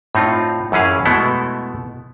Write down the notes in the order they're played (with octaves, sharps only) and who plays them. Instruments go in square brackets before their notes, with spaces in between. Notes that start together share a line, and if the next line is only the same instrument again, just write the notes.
[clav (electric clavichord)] A2 C4 D#4 F4
F#2 E3 C#4 G#4 F5
B2 G#3 A3 B3 E4 A4